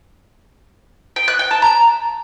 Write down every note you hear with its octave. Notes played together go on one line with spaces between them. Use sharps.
G5
F#6
G5
A5
A#5